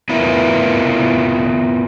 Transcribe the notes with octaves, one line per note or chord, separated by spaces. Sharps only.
B3 E4 F4 A#4 B4 E5